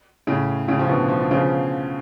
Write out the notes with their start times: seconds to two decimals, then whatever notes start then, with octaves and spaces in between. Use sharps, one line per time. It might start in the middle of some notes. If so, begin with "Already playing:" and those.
0.27 A2 C#3
0.68 A2 C#3
0.79 F3
0.89 B2 D3
1.08 F3
1.20 D3
1.31 C#3 F3